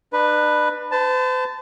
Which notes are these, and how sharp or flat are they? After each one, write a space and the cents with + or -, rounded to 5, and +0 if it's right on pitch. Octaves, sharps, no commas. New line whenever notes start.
D4 +40 B4 +0
C5 -45 A5 +0